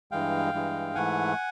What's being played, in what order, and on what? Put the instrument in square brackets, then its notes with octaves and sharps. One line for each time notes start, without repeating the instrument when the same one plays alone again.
[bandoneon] G2 E3 G#3 F5 G5
G2 E3 G#3
G#2 E3 A3 F#5 G#5